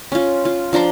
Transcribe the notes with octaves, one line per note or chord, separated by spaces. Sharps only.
C#4 F4
F4
F3 D4 A#5 C6